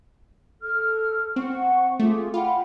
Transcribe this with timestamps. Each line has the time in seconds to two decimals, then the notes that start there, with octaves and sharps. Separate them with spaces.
0.62 A4 F6
1.36 C4 F#5 C#6
1.99 A3 F4 G#4 D6
2.34 F4 F#5 G5 B5